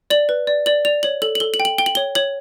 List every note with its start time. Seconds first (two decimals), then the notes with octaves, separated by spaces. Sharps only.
0.10 D5 F#7
0.29 B4
0.47 D5
0.66 D5 F#7
0.85 D5 F7
1.03 C#5 F#7
1.22 A4 F#7
1.35 F#7
1.40 A4 G7
1.54 F#7
1.60 G5
1.65 F#7
1.78 G5 G7
1.86 F#7
1.95 C#5 G7
2.15 C#5 F#7